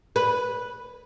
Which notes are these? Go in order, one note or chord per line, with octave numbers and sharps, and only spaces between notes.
B4